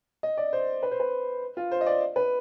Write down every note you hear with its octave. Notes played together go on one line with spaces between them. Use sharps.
D#5
D5
C5
B4
C5
B4
F4
C5
D#5
D5
B4